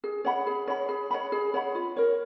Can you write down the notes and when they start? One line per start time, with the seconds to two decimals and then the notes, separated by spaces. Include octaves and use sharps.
0.04 G#4
0.25 C#5 F#5 B5
0.47 G#4
0.68 C#5 F#5 B5
0.89 G#4
1.11 C#5 F#5 B5
1.32 G#4
1.54 C#5 F#5 B5
1.75 F4
1.97 A#4 C#5